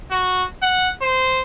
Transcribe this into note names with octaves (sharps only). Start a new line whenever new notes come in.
F#4
F#5
C5